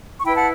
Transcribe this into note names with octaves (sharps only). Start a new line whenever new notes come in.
C#6
E4 B4 G5 B5
F#5 A5